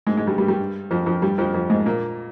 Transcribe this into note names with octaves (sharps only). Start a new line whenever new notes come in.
G#2 G#3
G#2 G#3
G2 G3
G2 G3
G2 G3
F2 F3
F2 F3
G2 G3
F2 F3
F2 F3
G#2 G#3
A#2 A#3